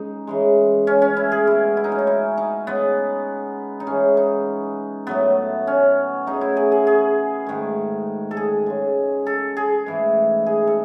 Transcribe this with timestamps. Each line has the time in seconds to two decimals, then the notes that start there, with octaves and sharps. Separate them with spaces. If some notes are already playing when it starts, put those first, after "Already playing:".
Already playing: C#3 G#3 D#4
0.27 C#3 E3 G#3
0.87 C#4
1.02 C#4
1.17 E4
1.32 G#4
1.47 B2 G#3 E4
1.77 E4
1.84 D#4
1.92 C#4
1.99 D#4
2.07 E4
2.37 D#4
2.67 C#3 G#3 B3
3.80 D#4
3.87 C#3 E3 G#3 C#4
4.17 D#4
5.07 A2 F#3 A3 B3
5.67 C#4
6.26 C#3 F#3 A3 D#4
6.41 E4
6.57 G#4
6.72 G#4
6.87 G#4
7.47 G#2 D#3 A3
8.31 A4
8.37 G#4
8.66 C#3 G#3
9.26 A4
9.57 G#4
9.86 G#2 E3 A3
10.46 G#4
10.67 A4